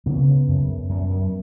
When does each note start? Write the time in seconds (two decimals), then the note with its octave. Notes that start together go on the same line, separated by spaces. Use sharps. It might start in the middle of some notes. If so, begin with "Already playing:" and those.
0.06 C#3 B3
0.27 C#3
0.48 F#2
0.68 F#2
0.89 F#2
1.10 F#2